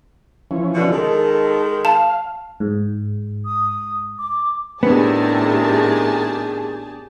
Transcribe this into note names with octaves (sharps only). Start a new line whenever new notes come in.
E3 F3 C#4
B2 D3
D#3 G#3 A4
F5 A5
G#2
D#6
D6
A2 C3 D#3 B3 D4 G4 G#4 A5